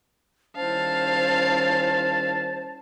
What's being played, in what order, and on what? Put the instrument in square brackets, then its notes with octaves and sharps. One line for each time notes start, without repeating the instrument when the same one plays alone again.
[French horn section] D#3 G3 C#4 [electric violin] E4 F5 [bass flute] C5 [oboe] A5